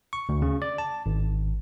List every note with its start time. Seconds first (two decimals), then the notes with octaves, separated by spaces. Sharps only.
0.13 C#6
0.29 D2
0.42 C#3
0.62 D5
0.78 A5
1.06 G#1